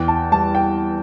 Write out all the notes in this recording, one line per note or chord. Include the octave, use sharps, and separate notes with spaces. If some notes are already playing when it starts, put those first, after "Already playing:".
Already playing: E2 G5
A5
G3 A5
G5